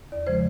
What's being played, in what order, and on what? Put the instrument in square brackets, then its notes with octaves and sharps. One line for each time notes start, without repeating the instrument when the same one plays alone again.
[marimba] E2 D5
C#3 F3 G#3 C5